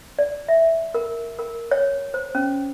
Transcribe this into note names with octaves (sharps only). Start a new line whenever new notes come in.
D5
E5
A#4
A#4
C#5
C5
C#4